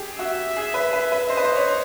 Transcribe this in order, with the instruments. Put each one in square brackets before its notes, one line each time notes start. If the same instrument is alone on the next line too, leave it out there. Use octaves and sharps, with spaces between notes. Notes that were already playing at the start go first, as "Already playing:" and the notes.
Already playing: [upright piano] G4 G#4
[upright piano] F#4 [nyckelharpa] E5
[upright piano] G#4
B4
B4
B4
[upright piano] C5 [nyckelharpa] D#5
[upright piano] B4
C5
C#5
C5